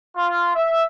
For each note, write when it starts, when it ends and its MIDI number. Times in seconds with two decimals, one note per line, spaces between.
0.16 0.52 65
0.55 0.83 76